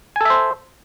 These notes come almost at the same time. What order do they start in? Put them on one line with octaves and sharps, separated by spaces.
G#5 A4 E5 C5